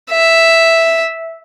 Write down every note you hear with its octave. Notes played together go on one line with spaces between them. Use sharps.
E5